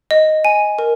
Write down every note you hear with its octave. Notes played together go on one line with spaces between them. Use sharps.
D#5
G#5
A#4